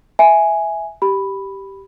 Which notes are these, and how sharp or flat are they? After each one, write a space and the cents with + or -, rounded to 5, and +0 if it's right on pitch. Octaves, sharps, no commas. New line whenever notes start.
E5 -5 G#5 +0
G4 -10 B5 +0